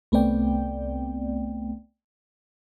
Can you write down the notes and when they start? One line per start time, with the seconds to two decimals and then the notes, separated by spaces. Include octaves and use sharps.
0.12 C2 A3 B3 C4 D5 G5